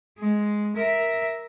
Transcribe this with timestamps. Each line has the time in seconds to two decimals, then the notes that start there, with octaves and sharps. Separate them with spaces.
0.18 G#3
0.77 A#4 E5